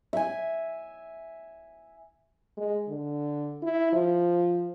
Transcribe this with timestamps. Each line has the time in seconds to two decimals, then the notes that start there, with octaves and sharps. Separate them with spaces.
0.13 E5 G#5
2.57 G#3
2.89 D3
3.63 E4
3.93 F3